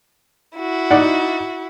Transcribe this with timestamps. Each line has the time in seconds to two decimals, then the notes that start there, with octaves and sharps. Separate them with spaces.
0.58 E4 F#4
0.91 D#4 D5 F#5